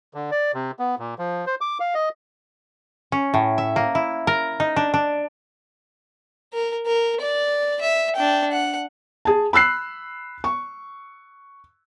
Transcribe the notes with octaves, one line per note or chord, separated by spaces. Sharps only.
D3
D5
C3
B3
A#2
F3
C5
D6
F5
D#5
C#4
A2
E5
A#3
E4
A#4
D#4
D4
D4
A#4
A#4
D5
E5
D4 G5
F#5
G#4 A5
B5 E6 F#6 C7
C#6